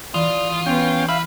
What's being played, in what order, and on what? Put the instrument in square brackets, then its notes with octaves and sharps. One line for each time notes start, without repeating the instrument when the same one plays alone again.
[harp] E3 [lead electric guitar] F4 [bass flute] D5 [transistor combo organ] D#6
[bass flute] B3 [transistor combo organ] C#4 G5
[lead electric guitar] B4 [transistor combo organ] E5 F5